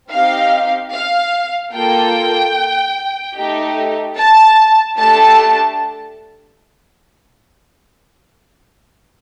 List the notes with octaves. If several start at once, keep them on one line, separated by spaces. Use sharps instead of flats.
C4 D#4 G4 F5
F5
A#3 F4 A4 G5
A3 D#4 G4
A5
A3 D4 G4 A5